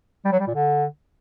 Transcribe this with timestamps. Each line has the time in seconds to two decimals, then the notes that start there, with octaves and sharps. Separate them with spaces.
0.25 G3
0.32 F#3
0.40 G3
0.47 A#2
0.54 D3